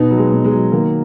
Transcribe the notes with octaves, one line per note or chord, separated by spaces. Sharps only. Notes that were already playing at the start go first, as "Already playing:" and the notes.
Already playing: B2 B3 D#4
F#3
G#3
B2
G#3
F#3
D#3 A#3